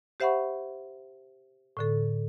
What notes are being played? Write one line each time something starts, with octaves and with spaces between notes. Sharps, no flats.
G4 C5 E5 F#5 B5 C#6
A2 D3 A4